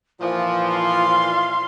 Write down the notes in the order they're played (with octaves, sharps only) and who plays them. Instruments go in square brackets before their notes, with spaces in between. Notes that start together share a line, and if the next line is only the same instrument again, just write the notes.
[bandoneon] A#2 E3 [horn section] F3 [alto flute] F4
[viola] F5 C6